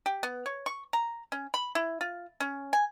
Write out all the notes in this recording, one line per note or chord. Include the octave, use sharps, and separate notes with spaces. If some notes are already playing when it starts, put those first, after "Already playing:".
G4
B3
C#5
C#6
A#5
C#4
B5
E4
F4
C#4
G#5